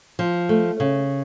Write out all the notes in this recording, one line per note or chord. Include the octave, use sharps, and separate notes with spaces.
F3
A3
C#3